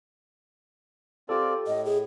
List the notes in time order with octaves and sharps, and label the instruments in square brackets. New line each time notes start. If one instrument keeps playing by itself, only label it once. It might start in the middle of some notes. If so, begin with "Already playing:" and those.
[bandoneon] C4 F4 D5 [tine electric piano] G4 A4
[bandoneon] A2 [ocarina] D#5
[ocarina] G#4